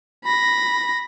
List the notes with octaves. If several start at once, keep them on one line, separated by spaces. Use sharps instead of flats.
B5 A#6